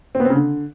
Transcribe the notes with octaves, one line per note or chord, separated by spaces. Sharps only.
C4
B3
C4
C#3
D3